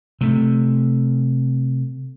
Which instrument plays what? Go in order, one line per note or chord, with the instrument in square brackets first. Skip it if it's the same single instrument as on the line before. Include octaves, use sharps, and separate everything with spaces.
[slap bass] C3 A3